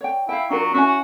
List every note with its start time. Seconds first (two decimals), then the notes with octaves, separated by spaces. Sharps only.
0.01 C#5 D5 G5
0.29 E4 F5 G5
0.50 F#3 D4 F4 A#4
0.74 C#4 E4 F#4 G#5